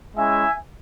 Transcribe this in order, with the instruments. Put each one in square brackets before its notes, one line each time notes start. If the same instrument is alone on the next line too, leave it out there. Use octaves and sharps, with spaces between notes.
[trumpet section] G#3 C#4 E4 E5 G#5